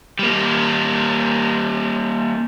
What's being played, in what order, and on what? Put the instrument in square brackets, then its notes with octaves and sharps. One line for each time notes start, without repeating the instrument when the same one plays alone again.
[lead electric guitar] G3 A#3